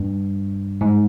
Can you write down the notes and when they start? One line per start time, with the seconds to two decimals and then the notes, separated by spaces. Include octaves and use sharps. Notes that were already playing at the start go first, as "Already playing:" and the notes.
Already playing: G2
0.81 G#2